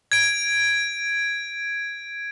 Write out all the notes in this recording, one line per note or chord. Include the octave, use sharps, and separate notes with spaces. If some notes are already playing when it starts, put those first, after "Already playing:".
G#6 D7